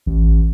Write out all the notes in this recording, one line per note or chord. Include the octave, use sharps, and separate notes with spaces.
A1